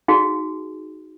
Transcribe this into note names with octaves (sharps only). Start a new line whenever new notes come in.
D#4 F#4 G#4